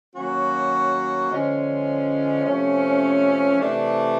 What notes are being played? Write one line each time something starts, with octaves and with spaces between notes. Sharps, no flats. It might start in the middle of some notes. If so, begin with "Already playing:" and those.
D#3 F#3 A#3 C#4 F#4
D3 F3 G#3 C#4
C3 F3 A3 C#4
C3 E3 A3 D4